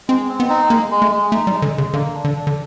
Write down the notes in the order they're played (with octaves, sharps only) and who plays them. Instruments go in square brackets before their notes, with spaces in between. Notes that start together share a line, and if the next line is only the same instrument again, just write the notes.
[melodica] G#3 [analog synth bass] C4
[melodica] C4
[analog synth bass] B3
[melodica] D#4
[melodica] G#3 [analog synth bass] A#3
[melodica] G#3
[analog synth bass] A3
[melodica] G#3
[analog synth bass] A3 [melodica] D#4
[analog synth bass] G3
[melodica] G#3
[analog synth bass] D3
[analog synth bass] C#3 [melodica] G#3
[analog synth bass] D3 [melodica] A#3
[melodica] D4
[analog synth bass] D3
[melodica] D4
[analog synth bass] D3